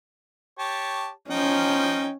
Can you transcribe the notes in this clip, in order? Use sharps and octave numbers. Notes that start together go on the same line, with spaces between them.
G4 C#5 A5
F3 C#4 D#4 G5